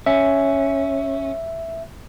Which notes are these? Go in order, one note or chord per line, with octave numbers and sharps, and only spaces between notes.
C#4 E5